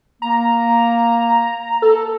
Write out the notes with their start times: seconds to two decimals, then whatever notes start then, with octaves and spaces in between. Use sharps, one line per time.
0.22 A#3 A#5
1.82 A4